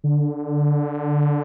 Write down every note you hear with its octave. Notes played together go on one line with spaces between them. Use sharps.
D3